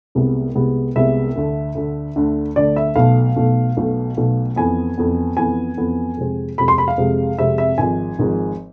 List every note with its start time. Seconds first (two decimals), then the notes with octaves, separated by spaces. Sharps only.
0.15 C2 C3 G#3 B3
0.55 C2 C3 G#3 B3
0.95 C2 C3 G#3 B3 E5
1.36 D2 D3 A3
1.75 D2 D3 A3
2.16 D2 D3 A3
2.56 D2 D3 A3 D5
2.76 E5
2.96 B1 B2 A3 F5
3.36 B1 B2 A3
3.77 B1 B2 A3
4.17 B1 B2 A3
4.56 F2 E3 B3 G#5
4.98 F2 E3 B3
5.37 F2 E3 B3 G#5
5.77 F2 E3 B3
6.17 F2 C3 G#3 C4
6.58 F2 C3 G#3 C4 B5
6.68 C6
6.78 B5
6.88 F5
6.98 F2 C3 G#3 C4
7.39 F2 C3 G#3 C4 E5
7.58 E5
7.78 G#1 G#2 F3 G#5
8.19 G#1 G#2 F3